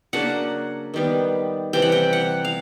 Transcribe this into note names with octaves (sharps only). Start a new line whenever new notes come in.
C#3 F#3 A#3 D4 F#5
D#3 G3 B3
C3 E3 G3 G5
F#5
G5
F#5
F5